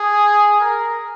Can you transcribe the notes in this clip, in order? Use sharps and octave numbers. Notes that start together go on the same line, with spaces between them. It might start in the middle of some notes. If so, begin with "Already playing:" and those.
Already playing: G#4
A#4